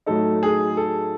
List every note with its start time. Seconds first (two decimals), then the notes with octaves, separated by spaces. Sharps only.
0.06 A2 F#3 A3 D#4 A4
0.43 G#4
0.77 A4